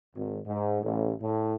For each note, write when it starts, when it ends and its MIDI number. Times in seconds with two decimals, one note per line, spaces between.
0.15 0.40 32
0.46 0.79 44
0.82 1.13 33
1.21 1.54 45